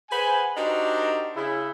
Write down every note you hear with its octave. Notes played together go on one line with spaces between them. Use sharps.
G#4 B4 C5 F#5 G#5
D4 D#4 F#4 G4 A#4 C5
C#3 E4